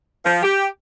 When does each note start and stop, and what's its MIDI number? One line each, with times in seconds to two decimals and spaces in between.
0.24 0.40 53
0.42 0.66 67